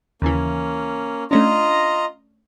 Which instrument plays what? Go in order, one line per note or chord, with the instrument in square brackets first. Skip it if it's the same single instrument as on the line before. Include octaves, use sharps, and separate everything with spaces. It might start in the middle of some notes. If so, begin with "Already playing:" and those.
[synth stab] D#2 C#3 E3 [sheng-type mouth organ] A#3 C#4
[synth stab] A3 C#4 D4 [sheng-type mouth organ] F4 D#5 A#5